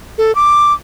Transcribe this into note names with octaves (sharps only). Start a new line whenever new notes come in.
A4
D6